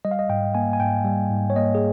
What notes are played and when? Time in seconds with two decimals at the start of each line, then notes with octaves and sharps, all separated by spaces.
0.05 G3 D#5
0.11 F5
0.19 D#5
0.29 G#2 G5
0.55 A#3 G#5
0.73 G#5
0.80 G#2 G5
1.05 G3
1.31 G#2
1.50 C#5
1.56 A#3 D#5
1.75 G#4